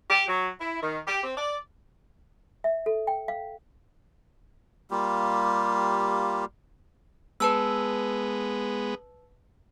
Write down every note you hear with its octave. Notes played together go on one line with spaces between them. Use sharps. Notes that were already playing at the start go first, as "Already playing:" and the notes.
G4
F#3
E4
D#3
G4
C4
D5
E5
A4
G5
F5
G3 A#3 F4 G4
G#3 B3 B4 A5 E6